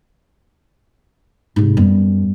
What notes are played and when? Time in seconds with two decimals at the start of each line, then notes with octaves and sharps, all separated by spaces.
1.56 G#2 C3
1.77 F#2 G3 B3